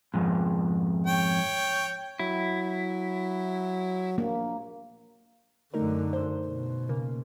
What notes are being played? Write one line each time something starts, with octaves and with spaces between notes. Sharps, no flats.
F2 G#2
C#5 G5
F#3 E4
A#1 A#3
F#2 D3 A3 D#4 A#4
C5
B2
C#3 A#3